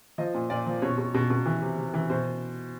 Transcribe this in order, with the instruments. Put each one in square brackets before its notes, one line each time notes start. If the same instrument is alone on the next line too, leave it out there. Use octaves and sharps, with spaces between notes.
[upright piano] F3 D#5
A#2
A#2 D5
F3
B2 C#5
B2
B2
B2
E3
C3
C3
E3
B2 C5